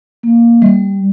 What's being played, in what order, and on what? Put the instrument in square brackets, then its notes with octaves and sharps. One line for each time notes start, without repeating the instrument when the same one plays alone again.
[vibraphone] A#3
G3